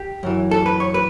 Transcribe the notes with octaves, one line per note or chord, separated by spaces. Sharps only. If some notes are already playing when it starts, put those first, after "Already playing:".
Already playing: G4
F#2 E3
A4
B4
C#5
B4